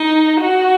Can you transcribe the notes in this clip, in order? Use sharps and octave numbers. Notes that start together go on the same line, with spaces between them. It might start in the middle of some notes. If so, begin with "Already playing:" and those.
Already playing: D#4
F#4